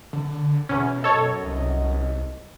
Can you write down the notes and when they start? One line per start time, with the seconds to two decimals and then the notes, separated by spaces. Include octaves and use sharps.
0.13 D3
0.69 E2 B2 C#4
1.04 F#2 A4 C#5 D#5
1.43 C2